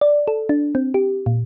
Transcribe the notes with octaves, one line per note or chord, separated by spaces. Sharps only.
D5
A4
D4
C4
G4
A#2